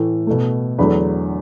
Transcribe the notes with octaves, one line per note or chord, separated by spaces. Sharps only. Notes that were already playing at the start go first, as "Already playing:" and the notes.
Already playing: A2 E3 A3
B2 A3
E2 D3 F#3 A3 B5